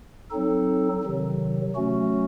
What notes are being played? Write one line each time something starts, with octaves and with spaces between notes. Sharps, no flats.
F#3 C4 D#4 A4
C3 D#3 F#3
F#3 A3 C#4 F#4